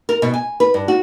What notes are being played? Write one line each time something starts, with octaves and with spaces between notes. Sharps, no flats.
A#4
B2
G#5
B4
G2
F#4